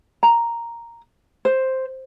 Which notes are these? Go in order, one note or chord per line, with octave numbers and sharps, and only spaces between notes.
A#5
C5